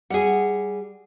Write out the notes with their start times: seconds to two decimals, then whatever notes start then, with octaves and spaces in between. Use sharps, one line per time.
0.10 G3 G#4 F#5